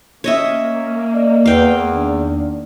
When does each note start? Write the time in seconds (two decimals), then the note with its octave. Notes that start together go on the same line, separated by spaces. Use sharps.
0.24 A#3 C#4 C#5 D#5 E5
1.14 D5 D#5
1.46 E2 B4 F5 G5
1.94 D#3 D4